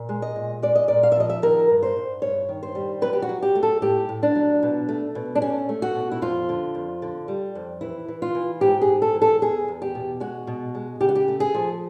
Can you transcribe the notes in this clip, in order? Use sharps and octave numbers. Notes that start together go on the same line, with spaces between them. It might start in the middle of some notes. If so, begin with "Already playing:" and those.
Already playing: A#2
G#3
D#5
A#2
G#3 D5
D#5
A#2 D5
F5
E5
F3 D#5
E5
D#3 A#4
G2
C5
G2
G2 C#5
D#3
C5
G3
F#3 B4
G4
F#4
F#3
G4
A3
A4
A2 G4
A2
D4
F#3
B2
A3
B2
D4
A3 C#4
A3
F#4
B2
E4
F2 F4
D3
F2
D3
G3
F2
E3 E4
E3
F4
E3
G#2 G4
G#4
G#2
A4
E3
A4
E2 G#4
E2
G4
B2
G#3 F#4
B2
G#3
C#3 G4
F#4
G4
A3
G#4
F3